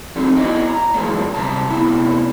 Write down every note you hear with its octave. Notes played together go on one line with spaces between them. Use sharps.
F3 F#3 A3 C4 D4 D#4
B3 E4 D5 D#5 F#5 G#5
A#5
F#2 E3 F3 G#3 A#3 D4
C3 G3 A5 A#5
A2 C3 B3 E4